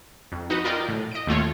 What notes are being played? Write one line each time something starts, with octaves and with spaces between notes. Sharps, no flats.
F2
D#4 F#4 B4 D#5
F4 A#4 D5 D#5 G5
A2
D#5 D7
D#2 A3 F4 C#5